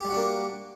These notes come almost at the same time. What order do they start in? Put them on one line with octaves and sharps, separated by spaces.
G4 G3 F#4 D4 A#3